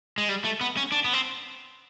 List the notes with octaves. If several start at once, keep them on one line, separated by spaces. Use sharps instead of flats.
G#3
G3
A3
B3
C#4
D4
B3
C4